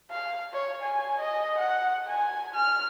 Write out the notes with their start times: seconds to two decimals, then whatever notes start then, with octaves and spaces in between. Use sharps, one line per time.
0.11 F5
0.53 C#5
0.82 G#5
1.20 D#5
1.58 F#5
2.07 G#5
2.55 F6